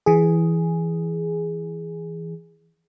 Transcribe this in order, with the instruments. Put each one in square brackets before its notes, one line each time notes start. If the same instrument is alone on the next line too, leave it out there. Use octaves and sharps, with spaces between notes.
[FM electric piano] E3 G#4